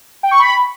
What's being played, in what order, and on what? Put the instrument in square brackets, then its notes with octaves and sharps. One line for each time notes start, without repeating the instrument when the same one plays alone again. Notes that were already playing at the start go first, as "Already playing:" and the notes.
[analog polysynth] G5
C#6
B5